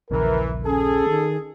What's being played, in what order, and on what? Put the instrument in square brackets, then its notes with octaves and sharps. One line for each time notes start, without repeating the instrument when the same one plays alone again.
[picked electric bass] D#1 A#1 C#3 [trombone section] E3 [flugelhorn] A#4
[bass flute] C#4 [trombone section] G#4 [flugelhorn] A4
[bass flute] D#3